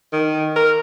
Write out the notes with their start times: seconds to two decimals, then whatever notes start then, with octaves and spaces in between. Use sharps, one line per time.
0.13 D#3
0.56 A#4